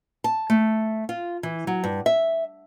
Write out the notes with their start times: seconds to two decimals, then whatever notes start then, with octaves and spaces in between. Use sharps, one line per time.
0.24 A5
0.50 A3
1.09 F4
1.43 E3
1.67 F#3
1.84 G2
2.06 E5